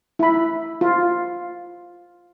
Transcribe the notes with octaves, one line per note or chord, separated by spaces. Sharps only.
E4 B5
F4